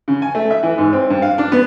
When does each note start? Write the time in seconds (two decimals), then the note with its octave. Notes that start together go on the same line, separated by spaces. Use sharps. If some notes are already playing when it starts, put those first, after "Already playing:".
0.08 C#3
0.22 G#5
0.35 A3
0.51 E5
0.63 E3
0.78 G#2
0.93 C4
1.10 G2
1.22 F5
1.38 D4
1.52 B3